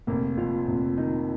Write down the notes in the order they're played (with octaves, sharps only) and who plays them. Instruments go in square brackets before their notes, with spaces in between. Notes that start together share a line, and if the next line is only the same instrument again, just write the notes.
[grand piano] F1 [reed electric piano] A#3
[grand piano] F2 [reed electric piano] F4
[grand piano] F1
[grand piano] D#3 [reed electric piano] D#4